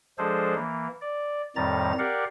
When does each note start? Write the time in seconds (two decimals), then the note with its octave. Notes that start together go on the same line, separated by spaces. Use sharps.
0.18 F3 G#3 D4 G#4 A4 C5
0.55 E3 A#3
1.01 D5
1.56 F2 A2 D#3 G3 A#5 A6
1.99 G4 A#4 D5 F5 F#5